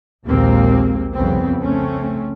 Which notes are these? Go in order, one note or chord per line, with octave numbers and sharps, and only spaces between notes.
A#1 D#2 A#2 G#3 A#3 C4
C2 F2 C#3 B3 C4
C#3 A3 C4 C#4